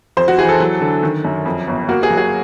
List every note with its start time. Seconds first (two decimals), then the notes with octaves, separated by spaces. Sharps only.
0.17 F2 C5
0.28 F#4
0.38 E3 G#4
0.49 A4
0.60 F#3
0.81 D3
1.03 D#3
1.25 F#2
1.46 F2
1.68 G1
1.89 A#3 F#4
2.03 G#4
2.10 F#3
2.17 G#4